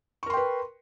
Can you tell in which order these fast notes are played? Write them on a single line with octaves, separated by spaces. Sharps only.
C#6 A#4 C6 G5 B4